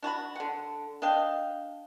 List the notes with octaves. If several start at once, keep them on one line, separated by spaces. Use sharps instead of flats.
D4 F#4 A5 B5
D3 F#5
D4 D#5 F5 G5